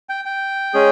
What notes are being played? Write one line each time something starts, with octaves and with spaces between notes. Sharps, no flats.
G5
G5
G#3 C#4 G#4